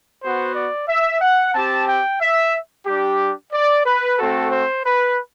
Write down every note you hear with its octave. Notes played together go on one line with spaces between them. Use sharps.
B3 F#4 C5
D5
E5
F#5
C4 G4 A5
G5
E5
G3 D4 G4
D5
B4
A3 C4 F#4 A4
C5
B4